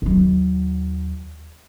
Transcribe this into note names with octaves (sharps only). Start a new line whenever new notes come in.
D#2 F#3